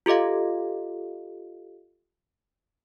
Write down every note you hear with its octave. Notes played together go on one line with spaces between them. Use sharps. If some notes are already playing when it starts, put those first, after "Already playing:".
F4 G4 A4 D#5 F5